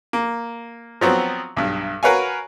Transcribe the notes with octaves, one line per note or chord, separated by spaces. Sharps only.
A#3
F3 F#3 B3 C4
B1 G2
F#4 A#4 B4 C#5 F5 G#5